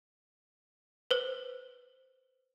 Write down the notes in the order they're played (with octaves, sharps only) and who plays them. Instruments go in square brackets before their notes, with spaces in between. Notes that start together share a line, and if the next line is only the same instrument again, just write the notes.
[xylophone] B4 C5